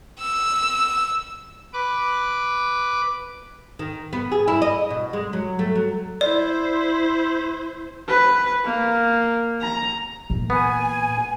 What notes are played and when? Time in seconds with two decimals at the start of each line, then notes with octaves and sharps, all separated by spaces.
0.20 E6
1.73 B4 D6
3.79 D#3
4.13 B3
4.32 G#4
4.48 E4
4.62 D#5
4.90 B2
5.13 G#3
5.33 F#3
5.59 A3
5.75 F#3
6.21 E4 C5 D5
8.08 B4
8.65 A#3
9.61 A#5
10.30 A#2 E3
10.50 B3 G#5